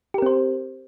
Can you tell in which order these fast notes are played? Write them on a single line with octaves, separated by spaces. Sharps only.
G4 A#4 C4 C5